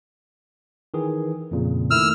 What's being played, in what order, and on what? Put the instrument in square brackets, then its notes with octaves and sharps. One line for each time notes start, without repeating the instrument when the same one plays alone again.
[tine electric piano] D#3 E3 G#4
F2 A#2 C#3
[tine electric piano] D#3 A3 E4 [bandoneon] E6 F6